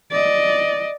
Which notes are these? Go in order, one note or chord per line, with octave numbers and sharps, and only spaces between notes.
D5 D#5